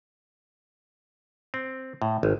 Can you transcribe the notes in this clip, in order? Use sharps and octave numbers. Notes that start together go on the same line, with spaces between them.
C4
A2
G#1